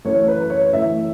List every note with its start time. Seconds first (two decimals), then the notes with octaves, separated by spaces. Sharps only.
0.05 F#2 E3 A3 C#5
0.28 B4
0.50 C#5
0.73 F#2 E3 A3 E5